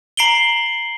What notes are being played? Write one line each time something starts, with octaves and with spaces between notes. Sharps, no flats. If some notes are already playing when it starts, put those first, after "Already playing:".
A#5 C7 D7 F#7 G7